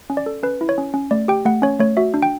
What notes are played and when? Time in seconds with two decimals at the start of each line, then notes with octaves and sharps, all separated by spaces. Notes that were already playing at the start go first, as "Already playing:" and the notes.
0.10 C#4
0.17 D5
0.26 A4
0.43 C#4 B4
0.61 E4
0.69 C#5
0.78 C#4
0.94 C#4
1.11 A3 D5
1.28 G4 G5
1.45 A3 F#5
1.62 C#4 C#5
1.80 A3 C#5
1.97 F#4 E5
2.14 D4
2.23 G5